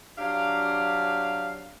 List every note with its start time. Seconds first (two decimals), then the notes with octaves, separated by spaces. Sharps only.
0.18 F#3 D4 G4 F5